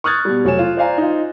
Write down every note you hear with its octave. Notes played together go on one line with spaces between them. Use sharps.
C#6 D#6 F6 F#6 G#6 A6
B2 G3
F1 F#3 C#5 G#5 E7
F4
C5 D5 F5 G#5 A#5
D#4 F4